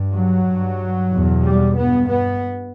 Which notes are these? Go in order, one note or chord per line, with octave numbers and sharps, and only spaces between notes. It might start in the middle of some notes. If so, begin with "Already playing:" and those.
Already playing: G2
F#3
G2
E2 B2
G3
G2 B3
B3